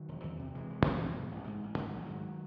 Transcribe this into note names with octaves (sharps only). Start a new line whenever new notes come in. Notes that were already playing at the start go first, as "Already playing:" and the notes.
Already playing: D#3 F#3
E1
E2
C3
E1 E3 G#3
E1
E2
C3
G#2
A1
G#2
A1
G#2 D#3 F#3
A1
G#2